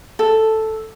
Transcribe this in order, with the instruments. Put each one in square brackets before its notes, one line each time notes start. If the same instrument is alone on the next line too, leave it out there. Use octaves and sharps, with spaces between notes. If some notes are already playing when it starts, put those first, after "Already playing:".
[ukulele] A4